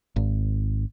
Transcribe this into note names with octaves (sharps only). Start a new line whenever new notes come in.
G#1